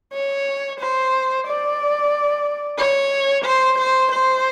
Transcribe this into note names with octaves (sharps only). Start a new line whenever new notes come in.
C#5
C5
D5
C#5
C5
C5
C5